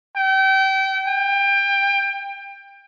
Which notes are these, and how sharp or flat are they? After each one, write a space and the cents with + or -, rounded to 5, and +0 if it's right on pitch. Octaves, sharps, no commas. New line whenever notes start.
G5 -30
G5 +25